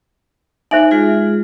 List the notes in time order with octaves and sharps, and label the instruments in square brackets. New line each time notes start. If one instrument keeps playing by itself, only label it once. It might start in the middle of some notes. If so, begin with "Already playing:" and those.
[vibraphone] D#4 [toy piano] C5 E5 G#5
[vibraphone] G#3 F4 G#4